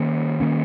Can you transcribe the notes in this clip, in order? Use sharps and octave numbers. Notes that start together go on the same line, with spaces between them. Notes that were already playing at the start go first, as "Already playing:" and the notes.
Already playing: D#3 A#3 C#4
D#3 A#3 C#4